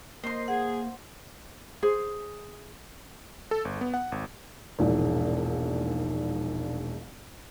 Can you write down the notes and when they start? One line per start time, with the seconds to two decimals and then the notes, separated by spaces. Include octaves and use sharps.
0.24 A#3 C5 D#5 C6
0.48 G#4 F#5
1.82 G#4 C5
3.51 A4
3.65 G1
3.81 B3
3.94 F#5
4.12 G#1
4.79 E1 A#1 G#2